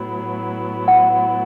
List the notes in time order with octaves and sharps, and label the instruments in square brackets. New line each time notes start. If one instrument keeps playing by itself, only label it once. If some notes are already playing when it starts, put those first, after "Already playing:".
Already playing: [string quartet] A2 F#3 B3 E4
[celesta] F#5